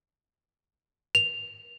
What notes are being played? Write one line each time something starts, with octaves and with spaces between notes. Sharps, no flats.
F7